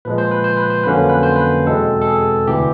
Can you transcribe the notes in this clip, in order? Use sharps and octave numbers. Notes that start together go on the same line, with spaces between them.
A#2 F3 G#3 B4
C5
B4
C5
B4
C5
F2 D3 F#3 A#3 C#4 B4
C5
B4
C5
B4
E2 B2 G#3 C4 A4
A4
G#4
D2 C3 E3 G4